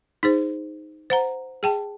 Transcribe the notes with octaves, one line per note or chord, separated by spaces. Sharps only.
D#4 G#4 C5
C5 F#5 A#5
G#4 G5 A5